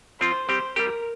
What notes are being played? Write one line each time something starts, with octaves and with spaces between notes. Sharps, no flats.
F3 C4 F4 C5
G3 C4 G4 C5
G3 C4 G4 A#4